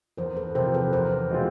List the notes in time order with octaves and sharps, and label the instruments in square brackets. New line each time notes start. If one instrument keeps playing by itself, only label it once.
[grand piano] E2 [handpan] A#4 C5
[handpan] A4 B4
[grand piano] C3 F3 [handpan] A#4 C5
[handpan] A4 B4
[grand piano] E2 [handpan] A#4 C5
[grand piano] B2 G#3 C4 F4